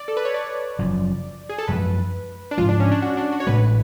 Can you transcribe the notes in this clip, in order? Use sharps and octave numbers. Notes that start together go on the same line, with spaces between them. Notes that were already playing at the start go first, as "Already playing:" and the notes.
Already playing: D5
A4
B4
C#5
D5
F#1 F#2 F3
G#4
A4
F#2 F3 G#3 B4
D4
G#2 F3 G#3 F4
D4
C#4
D4
F#4
D4
F#4
C#5
A1 A2 G#3 B4